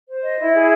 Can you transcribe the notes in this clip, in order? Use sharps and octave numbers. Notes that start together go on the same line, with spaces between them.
C5
D#5
E4
G#4